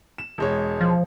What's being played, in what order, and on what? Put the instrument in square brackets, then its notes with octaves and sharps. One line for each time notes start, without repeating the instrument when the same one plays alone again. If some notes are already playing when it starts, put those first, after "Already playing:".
[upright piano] E7
E1 G#3 C#5
[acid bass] F3